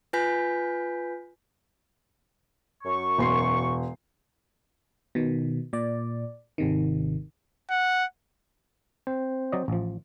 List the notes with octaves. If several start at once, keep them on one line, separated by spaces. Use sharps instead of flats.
F4 B4 G#5 G6 B6
F#2 C#6
E1 C6 C7
B2 D#3
A#2 D5
G#1 C3 D#3
F#5
C4 C5
F#3 D5 D#5
A1 F3